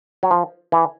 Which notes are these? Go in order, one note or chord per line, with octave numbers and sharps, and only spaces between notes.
F#3
F3
E3